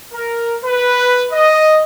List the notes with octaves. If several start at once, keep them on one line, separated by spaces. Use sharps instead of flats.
A#4
B4
D#5